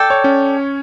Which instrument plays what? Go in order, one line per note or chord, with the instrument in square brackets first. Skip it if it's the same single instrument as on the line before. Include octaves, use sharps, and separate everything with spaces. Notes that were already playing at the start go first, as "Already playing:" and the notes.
Already playing: [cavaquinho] A4 D5 G5
[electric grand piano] C#5
C#4